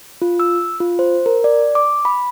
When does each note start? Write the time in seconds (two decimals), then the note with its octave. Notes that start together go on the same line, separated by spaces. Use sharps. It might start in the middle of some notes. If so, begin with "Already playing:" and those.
0.22 F4
0.40 E6
0.80 F4
0.99 C5
1.26 A#4
1.44 D5
1.75 D6
2.05 B5